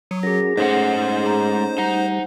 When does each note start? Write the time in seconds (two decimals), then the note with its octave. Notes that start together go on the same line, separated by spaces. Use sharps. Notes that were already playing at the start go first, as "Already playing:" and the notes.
0.11 F#3 C#6 D#6
0.23 C#4 F#4 G#4 A#4 A#6
0.57 G#2 G#3 A3 C#4 D#4 C5 F#5
1.23 G#4 A#5
1.78 G3 D#4 F#5